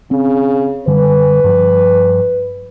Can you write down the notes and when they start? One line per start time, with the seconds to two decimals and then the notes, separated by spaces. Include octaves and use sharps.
0.11 C#3 C4
0.87 F#2 D3 G3 B4
1.44 G2 F3